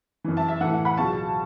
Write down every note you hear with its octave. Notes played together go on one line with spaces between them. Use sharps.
F#2 E3
E5 A5
E5
A2 E3 F#5
F#5
F#5 B5
C#2 B2 F#3 A5 C#6